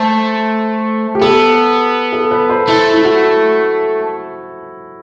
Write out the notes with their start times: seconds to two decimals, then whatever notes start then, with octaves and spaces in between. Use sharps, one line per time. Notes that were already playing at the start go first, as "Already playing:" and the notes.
Already playing: A3 C5
1.15 G4
1.21 B3 A4
2.13 A4
2.31 B4
2.49 C5
2.68 A3 E4
2.94 E4
3.04 F#4